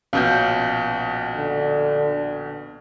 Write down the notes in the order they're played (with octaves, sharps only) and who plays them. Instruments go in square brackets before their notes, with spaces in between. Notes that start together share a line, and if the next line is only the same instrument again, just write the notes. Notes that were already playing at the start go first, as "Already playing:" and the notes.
[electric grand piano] A#1 B2 G6 [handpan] C#4 F5
[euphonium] D3